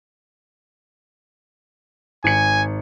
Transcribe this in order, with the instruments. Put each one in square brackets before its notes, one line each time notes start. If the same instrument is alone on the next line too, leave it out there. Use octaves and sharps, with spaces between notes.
[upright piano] G#1 C#7 [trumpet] G#5